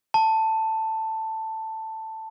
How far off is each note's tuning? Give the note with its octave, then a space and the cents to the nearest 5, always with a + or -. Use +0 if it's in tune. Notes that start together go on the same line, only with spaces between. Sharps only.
A5 +10